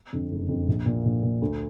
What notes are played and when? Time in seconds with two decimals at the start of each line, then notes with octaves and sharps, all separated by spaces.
0.13 F2 D3
0.32 F#1
0.49 F2 D3
0.68 A#1
0.86 A#2
1.05 A#1
1.23 A#2
1.42 D2